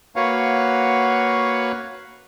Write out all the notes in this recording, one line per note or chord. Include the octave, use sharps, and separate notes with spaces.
A#3 F#4 B4 C#5 F5 F#5